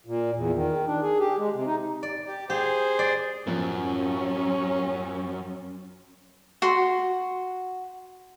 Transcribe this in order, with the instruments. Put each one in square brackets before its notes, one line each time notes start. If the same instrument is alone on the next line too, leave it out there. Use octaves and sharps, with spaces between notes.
[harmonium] A#2
E2
D#3
D4
G#4
G4
G#3
C3
D#4
[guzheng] D5
[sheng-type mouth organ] G4
[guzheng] G4 [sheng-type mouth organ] G#4 C5
[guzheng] D5
[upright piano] A1 F3 [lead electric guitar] F#2 [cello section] C#4
[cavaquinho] F#4 C6